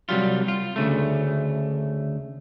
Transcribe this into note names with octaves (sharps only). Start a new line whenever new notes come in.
C2 F#3 G3 F4
F4
D2 C#3 A3